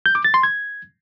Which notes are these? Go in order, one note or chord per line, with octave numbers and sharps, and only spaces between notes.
G6
D6
A6
C6
G#6